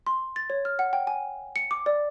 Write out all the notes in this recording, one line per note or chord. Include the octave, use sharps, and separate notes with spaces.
C6
A6
C#5
F6
F#5
G5
G#5
C#7
D6
D5